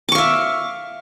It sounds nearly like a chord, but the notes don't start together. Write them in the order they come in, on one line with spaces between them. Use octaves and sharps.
D6 C#6 F5 E5